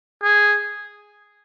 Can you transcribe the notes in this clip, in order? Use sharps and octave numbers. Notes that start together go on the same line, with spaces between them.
G#4